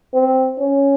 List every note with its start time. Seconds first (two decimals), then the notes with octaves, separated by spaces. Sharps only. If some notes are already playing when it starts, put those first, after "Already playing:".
0.14 C4
0.60 C#4